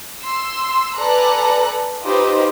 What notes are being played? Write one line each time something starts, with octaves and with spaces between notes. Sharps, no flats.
C6 E6
A4 B4 D5 G#5 A#5 F#6
D#4 F4 G4 B4 C5 D#5